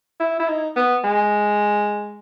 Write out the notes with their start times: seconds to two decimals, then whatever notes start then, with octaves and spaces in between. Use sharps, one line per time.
0.20 E4
0.40 E4
0.48 D#4
0.76 B3
1.04 G#3